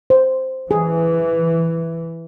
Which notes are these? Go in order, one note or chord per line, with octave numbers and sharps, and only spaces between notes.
C5
E3 G#4